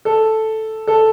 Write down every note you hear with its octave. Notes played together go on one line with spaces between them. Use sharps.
A4
A4